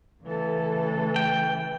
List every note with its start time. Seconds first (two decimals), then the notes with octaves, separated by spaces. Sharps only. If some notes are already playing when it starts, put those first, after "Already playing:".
0.23 C#3 E3 A3 A4
1.16 G5